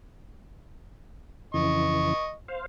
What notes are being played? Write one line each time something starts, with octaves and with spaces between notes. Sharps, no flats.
F2 C#3 E3 D#5 C#6
C5 F5